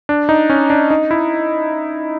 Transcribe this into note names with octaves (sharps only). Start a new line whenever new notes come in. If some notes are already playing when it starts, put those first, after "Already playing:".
D4
D#4
C#4
D4
D#4
E4